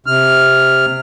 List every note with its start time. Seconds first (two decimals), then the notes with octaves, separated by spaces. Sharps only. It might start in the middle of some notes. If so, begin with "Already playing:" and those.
0.06 C3 F6